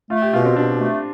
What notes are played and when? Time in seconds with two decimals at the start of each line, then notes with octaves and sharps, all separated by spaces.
0.10 A3 F4
0.22 G4
0.33 B2 F4
0.45 C4
0.56 B2 D4
0.80 A3